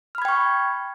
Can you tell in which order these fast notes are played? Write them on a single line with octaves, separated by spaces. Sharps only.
F6 B5 G#6 G5 C#6